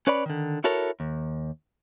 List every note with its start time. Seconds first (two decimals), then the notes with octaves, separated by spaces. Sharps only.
0.07 C#4 B4 C#5 D5 B5
0.26 D3 D#3
0.64 E4 F#4 A4 A#4 C#5
1.00 D#2